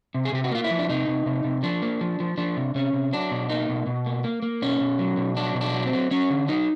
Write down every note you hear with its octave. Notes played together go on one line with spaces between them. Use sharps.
C3
G#4
C3 G4
F#4
A#3 F4
E4
F3
D4
C3 D#4
C3
C3
C3
F3 D4
A#3
F3
F3
F3 D4
C3
C3 C#4
C3
F#3 D4
B2
A#3 D#4
B2
B2
A#3
A#3
A#3
B2 C#4
B2
F#3
B2
F#3 D4
B2
D4
F#3
C4
F#3
F#3 C#4
D3
F#3 D#4